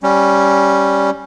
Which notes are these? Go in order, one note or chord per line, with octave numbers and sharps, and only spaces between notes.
G3 C#4